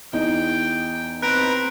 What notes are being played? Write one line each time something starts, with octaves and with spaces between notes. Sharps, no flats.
E2 D#4 G5
C4 B4 A#5 F#6 D7